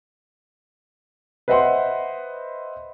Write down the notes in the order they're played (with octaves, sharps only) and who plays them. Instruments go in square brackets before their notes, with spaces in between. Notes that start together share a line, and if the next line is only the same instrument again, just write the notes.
[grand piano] B4 C5 D#5 E5 F#5 C6